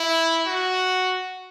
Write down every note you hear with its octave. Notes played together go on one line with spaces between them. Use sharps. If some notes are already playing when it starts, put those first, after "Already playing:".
Already playing: E4
F#4